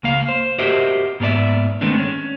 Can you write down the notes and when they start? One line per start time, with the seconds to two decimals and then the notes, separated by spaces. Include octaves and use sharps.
0.03 C#2 A#3 F5
0.29 C5
0.59 F#4 G4 A#4 C5 D#5 E5
1.20 G#2 A#3 B3 G#4 D5 E5
1.81 D#3 G#3 A3 B3 C4 D4
1.98 C#4